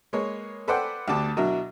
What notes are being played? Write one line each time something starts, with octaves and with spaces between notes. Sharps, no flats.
G#3 A#3 B4 C#5
A4 B4 C5 D5 F#5 G5
D2 D3 D4 G4 A5 D6
B2 F#3 D4 E4 A#4